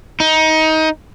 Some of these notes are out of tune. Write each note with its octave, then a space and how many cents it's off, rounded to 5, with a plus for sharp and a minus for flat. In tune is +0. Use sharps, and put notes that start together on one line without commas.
D#4 +20